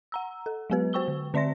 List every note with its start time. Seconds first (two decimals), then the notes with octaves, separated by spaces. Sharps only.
0.12 F#5 A#5 E6
0.46 A4
0.70 F#3 G#3 B3 G4 B4
0.93 F#4 C5 G5 C#6 E6 G7
1.08 D3
1.34 D3 C4 D5 E5 C6 A#6